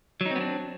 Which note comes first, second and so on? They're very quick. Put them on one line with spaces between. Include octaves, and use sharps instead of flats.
F#3 D#4 C4 B3 D4